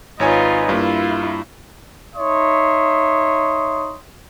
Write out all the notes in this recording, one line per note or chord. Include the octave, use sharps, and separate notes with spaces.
G#1 D#4 F4 B4 C#5 G#5
G2 A#3 E4 F4
D#4 C#5 E5 C6 D#6